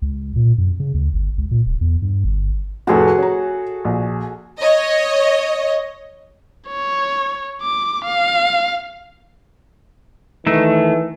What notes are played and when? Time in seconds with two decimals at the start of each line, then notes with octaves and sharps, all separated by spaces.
0.02 C#2
0.36 A#2
0.58 F#2
0.80 C#3
0.94 D2
1.13 G1
1.38 C#2
1.51 A#2
1.66 D1
1.81 E2
2.02 G2
2.24 G1
2.87 F1 A2 F#4 G#4 A4
3.18 C#4 A#5
3.85 A#1
4.60 C#5 D#5
6.68 C#5
7.62 D6
8.06 F5
10.47 D#3 E3 A3